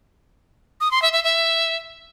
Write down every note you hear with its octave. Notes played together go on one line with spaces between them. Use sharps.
D#6
C6
E5
E5
E5